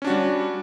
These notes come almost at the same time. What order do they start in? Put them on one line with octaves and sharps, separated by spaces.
C#4 D4 F#4 G3